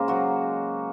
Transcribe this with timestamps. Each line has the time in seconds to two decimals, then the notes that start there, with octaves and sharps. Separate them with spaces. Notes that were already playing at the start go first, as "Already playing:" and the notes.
Already playing: C#3 G#3 A#3 A#4 C5
0.08 F#3 F#4